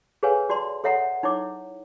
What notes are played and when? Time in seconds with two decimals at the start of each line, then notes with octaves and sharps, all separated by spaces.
0.23 G#4 A4 B4 C#5 F5 G#5
0.49 F#4 D5 A5 C6
0.84 A4 C#5 E5 F#5 A#5
1.23 D#4 E4 C#5 D6